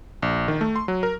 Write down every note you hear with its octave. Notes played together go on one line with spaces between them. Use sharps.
A#1
D#3
A3
C6
F#3
A#4